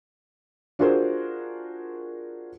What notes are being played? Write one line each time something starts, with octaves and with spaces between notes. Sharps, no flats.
D4 F4 F#4 G#4 A#4 C5